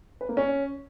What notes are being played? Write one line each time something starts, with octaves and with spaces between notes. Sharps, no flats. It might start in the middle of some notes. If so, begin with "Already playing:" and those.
B4
A#3
C#4